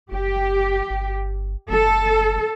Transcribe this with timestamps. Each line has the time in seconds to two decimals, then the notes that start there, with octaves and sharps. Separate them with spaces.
0.12 F#1 G4
0.90 G1
1.70 F#1 A4